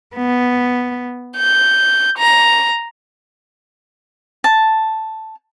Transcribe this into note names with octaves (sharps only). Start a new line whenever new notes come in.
B3
G6
A#5
A5